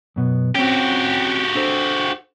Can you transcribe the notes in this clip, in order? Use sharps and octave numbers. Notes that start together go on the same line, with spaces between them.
F#2 B2 B3
C4 C#4 F#4 G4
D4 A4 C5